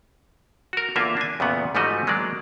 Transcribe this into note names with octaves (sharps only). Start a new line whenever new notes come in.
F#4 A#4
E2 D3 A#3 F4 E5
D4 G#5
E2 A#2 C#3 A3 B3 F#5
G#2 F3 G3 A3 F#4 D#5
F#3 G#3 A#3 D4 D5